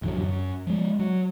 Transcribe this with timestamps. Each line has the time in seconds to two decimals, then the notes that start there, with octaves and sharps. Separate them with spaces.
0.02 A1 F2 D3 F#3
0.19 F#2
0.67 F3 G#3
0.99 F#3